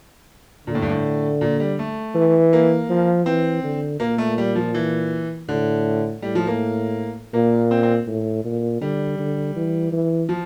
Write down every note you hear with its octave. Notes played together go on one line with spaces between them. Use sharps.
A#2 D3
A2
G2
A2
A#2
G3
A3
E3
A#3
F3
E3 C4
D3
A#2 A#3
A3
G3
F3
E3
A2 D3
A2 G3
F3
A#3
A#2 A#3
C4
C4
A2
A#2
D3 G3
D3
E3
E3
F3